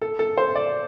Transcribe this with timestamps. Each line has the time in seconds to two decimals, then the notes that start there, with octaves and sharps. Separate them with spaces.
0.02 A4
0.19 A4
0.38 C5
0.55 D5